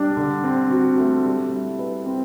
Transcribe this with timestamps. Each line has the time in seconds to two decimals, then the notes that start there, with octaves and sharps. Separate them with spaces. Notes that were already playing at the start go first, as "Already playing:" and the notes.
Already playing: G3 D4
0.16 D3
0.44 C4
0.70 F#4
0.98 A3
1.25 G3
1.52 E4
1.79 B4
2.06 C4